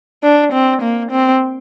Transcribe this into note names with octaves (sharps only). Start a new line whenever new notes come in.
D4
C4
A#3
C4